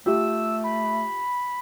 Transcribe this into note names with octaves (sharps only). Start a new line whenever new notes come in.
A3 F4 G4 E6
B5